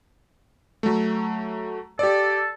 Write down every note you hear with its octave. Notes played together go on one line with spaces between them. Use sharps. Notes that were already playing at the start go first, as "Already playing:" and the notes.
F#3 A3
G4 A4 D5